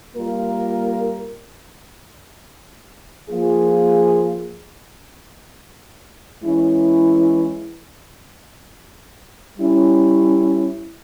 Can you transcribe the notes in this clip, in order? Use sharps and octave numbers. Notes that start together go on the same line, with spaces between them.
G3 A#3 F4 A#4
F3 A#3 F4 G#4
E3 G#3 C#4 E4
G3 C#4 E4